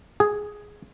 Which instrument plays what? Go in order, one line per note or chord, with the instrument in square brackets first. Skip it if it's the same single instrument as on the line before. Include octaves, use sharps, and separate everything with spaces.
[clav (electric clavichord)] G#4